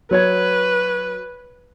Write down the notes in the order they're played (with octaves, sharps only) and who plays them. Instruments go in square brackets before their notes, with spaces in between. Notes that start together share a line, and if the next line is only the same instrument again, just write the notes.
[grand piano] F#3 C#5 G#6 [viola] B4